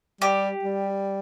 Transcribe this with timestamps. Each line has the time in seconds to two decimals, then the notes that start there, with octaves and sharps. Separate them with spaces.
0.21 G3 G4
0.63 G3